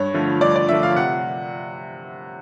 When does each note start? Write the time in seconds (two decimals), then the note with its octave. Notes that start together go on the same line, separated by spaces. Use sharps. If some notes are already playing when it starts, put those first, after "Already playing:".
Already playing: G2 C#5
0.14 D3 F3 A3
0.41 G2 D5
0.56 D5
0.69 D3 F3 A3 E5
0.83 F5
0.96 C3 F#5